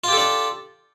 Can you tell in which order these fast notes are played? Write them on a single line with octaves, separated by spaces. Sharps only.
F4 G4 A4 D4